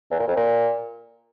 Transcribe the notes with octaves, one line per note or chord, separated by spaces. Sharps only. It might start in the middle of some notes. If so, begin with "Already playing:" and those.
E2
A#2
F2
A#2